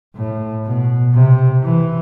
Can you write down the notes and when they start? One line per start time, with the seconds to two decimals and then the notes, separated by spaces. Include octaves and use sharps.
0.15 A2
0.65 B2
1.14 C3
1.63 E3